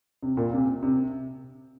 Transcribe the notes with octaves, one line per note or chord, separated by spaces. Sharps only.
C3
A#2
C3
C3